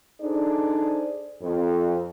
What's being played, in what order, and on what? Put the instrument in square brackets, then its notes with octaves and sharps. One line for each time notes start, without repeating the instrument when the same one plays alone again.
[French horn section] D4 D#4 G#4 A4 C5 D5
F2